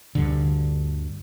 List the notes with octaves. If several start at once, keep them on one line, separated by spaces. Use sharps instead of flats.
D2 G2 D3